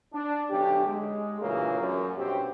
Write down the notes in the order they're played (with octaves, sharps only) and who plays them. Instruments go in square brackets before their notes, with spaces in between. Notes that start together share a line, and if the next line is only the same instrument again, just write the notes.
[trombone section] D4
B1 D3 C#4 G4
G#3
D2 A#2 C#3 E3 F#3 A#3
F#2
G2 B2 C4 F#4 G4